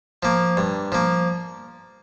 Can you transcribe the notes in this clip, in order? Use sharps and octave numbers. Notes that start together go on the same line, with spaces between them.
F3 A#3
G2
F3 A#3